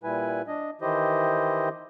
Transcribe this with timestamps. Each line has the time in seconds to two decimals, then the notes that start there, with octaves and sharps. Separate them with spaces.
0.03 A#2 G3 E4 B4 G#5
0.48 D4 D#5
0.81 D#3 E3 E4 G4 C5 D#5